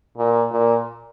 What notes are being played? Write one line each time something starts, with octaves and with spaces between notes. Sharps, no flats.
A#2
A#2